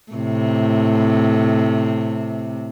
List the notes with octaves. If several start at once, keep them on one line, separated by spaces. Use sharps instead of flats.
A2 C3